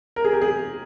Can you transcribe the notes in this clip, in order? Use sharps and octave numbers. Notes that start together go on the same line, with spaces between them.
A#4
G#4
G4
G#4